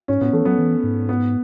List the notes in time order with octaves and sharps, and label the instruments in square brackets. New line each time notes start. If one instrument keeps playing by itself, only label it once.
[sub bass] G#2 [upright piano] C#4
[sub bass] A2 [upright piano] B3
[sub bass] E3 [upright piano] A3
[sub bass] F#3 [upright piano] B3
[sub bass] E3
G#2
[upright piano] B3